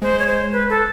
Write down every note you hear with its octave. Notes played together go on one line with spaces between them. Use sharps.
G#3 C5
C#5
C5
B4
A4